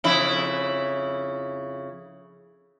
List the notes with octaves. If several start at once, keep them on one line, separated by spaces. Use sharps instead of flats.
F2 C#3 E4